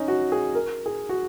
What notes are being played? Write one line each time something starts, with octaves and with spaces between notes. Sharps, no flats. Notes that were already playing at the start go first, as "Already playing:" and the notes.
Already playing: C#4 D#4
F#4
G#4
A#4
G#4
F#4